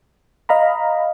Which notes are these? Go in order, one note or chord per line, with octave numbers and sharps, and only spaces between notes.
D#5 F5 A#5 B5